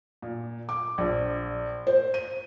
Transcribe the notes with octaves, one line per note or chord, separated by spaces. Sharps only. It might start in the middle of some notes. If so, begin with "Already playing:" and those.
A#2
D6
A#1
C5
D#7